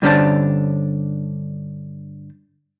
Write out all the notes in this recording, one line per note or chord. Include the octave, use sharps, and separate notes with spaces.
G2 D3 C#4 D4 C5 A5